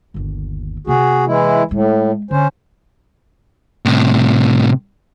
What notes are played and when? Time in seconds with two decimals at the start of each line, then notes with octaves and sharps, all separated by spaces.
0.14 G1 D#2
0.87 C3 A#3 F#4 G#4
1.27 E3 G#3 E4
1.71 A2 G#3
2.31 D3 C#4 C5
3.85 A2 C3